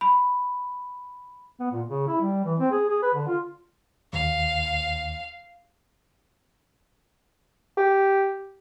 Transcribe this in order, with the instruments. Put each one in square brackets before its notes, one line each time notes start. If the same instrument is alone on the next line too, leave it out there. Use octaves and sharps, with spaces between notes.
[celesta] B5
[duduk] B3
A#2
C#3
E4
G3
E3
C4
G#4
G#4
B4
D3
F4
[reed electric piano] D#2 [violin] F5
[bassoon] G4